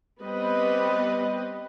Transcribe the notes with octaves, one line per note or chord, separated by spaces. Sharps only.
G3 B3 C4 B4 D#5